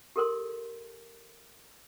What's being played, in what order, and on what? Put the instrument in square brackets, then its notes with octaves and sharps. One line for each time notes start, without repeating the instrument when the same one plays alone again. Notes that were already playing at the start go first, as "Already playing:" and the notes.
[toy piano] G4 A4 A#4 C6